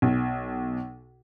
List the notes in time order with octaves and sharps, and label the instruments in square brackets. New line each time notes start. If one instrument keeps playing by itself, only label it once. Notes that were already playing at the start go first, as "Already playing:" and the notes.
[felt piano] B1